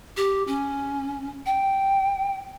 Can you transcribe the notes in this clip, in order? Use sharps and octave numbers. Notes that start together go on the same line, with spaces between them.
G4
C#4
G5